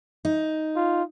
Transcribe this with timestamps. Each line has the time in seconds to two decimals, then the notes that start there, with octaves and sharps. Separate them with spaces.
0.25 D#4
0.76 F4